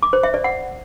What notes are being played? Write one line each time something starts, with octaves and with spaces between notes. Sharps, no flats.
D6
C5
E5
D5
F#5